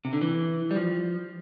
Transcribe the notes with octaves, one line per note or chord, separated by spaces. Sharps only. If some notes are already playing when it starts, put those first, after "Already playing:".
C3
D3
E3
G3
F3